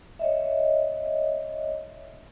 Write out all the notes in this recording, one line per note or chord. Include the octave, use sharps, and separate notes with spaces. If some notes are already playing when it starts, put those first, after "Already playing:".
C#5 D#5 E5